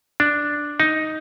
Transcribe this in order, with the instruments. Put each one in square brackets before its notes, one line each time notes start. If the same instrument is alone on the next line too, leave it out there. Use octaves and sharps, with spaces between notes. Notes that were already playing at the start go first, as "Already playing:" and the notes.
[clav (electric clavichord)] D4
D#4